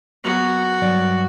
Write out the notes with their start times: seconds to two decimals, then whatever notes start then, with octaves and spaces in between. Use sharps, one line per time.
0.24 F#2 B3 F#4 C#6
0.82 G2 F#3 D5